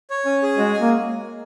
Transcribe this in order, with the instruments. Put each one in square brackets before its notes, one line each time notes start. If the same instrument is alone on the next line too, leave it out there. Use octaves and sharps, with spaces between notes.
[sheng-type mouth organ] C#5
C#4
G#4
[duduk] G#3 [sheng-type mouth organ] F#4
[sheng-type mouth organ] G#5
[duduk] A#3